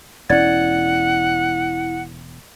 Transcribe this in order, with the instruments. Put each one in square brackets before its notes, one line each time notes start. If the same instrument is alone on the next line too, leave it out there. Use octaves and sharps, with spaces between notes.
[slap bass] E1 C#4 [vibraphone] E4 [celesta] D5 G#6 A6 [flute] F#5